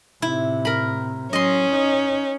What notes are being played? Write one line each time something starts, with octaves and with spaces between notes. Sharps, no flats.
A2 C3 E4
A#4 B5
F#3 C#4 D#5 C6
D#4